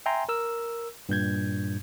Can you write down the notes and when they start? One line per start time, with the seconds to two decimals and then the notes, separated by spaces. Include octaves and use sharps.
0.06 E5 G5 G#5 A#5 C6
0.29 A#4 E6
1.09 G2 A#2 G6 G#6